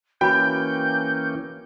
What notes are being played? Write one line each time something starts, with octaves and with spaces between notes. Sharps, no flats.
E3 A#3 C#4 F#4 G5 B5 G6